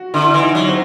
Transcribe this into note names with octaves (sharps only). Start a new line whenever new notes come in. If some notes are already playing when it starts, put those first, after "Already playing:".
Already playing: F#4
D3 E4
E3
D#4
F#3
C4